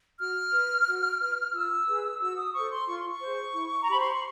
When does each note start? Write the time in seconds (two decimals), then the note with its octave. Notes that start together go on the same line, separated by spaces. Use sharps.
0.19 F#4 F6
0.53 B4
0.86 F#4
1.20 B4
1.53 F4 E6
1.86 G#4 B4
2.20 F#4 E6
2.37 D#6
2.53 A4 C5 C#6
2.71 C6
2.87 F4 C#6
2.98 C6
3.10 C#6
3.21 G#4 C5
3.54 E4
3.80 A#5
3.87 G4 C5 B5
4.00 C6
4.11 C#6